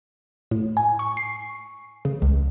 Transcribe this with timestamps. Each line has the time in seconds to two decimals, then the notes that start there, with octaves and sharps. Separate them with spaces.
0.51 A2
0.77 G#5
0.99 C#6
1.17 C7
2.05 C#3
2.22 C#2